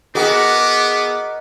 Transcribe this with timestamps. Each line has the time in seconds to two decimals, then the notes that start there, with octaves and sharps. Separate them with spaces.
0.15 B3 F#4 G#4 A#4 D#5 D6